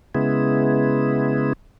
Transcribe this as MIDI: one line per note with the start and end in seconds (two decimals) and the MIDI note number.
0.15 1.53 49
0.15 1.53 56
0.15 1.53 59
0.15 1.53 64